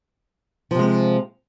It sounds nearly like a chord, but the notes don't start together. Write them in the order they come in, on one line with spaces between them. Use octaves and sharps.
F3 C3 G#3 C4